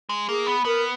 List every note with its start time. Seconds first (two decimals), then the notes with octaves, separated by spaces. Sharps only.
0.09 G#3
0.29 A#3 G#4
0.46 B3
0.65 B3 A#4